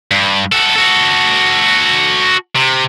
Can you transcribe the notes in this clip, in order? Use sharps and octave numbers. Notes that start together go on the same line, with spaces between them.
G2
F#4 A4
F#4 A4
C3